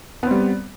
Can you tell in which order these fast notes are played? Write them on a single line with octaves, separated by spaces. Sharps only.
B3 C4 G3